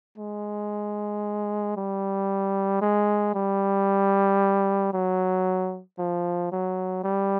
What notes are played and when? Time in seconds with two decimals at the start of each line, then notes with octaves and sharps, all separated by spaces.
0.18 G#3
1.77 G3
2.82 G#3
3.34 G3
4.93 F#3
5.99 F3
6.52 F#3
7.04 G3